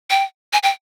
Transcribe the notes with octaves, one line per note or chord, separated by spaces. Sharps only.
G5
G#5
G5